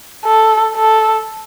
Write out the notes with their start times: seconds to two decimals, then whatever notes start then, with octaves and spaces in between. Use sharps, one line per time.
0.25 A4
0.76 A4